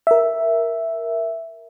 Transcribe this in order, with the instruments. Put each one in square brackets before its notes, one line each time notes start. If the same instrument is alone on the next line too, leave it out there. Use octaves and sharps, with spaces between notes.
[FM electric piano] A#4 E5